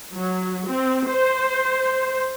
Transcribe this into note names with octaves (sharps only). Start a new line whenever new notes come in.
F#3
C4
C5